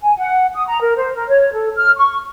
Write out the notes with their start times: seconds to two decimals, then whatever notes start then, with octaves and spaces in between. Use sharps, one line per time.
0.01 G#5
0.18 F#5
0.55 D#6
0.68 A#5
0.81 A#4
0.96 C5
1.15 A#4
1.28 C#5
1.53 A4
1.76 F6
1.96 C#6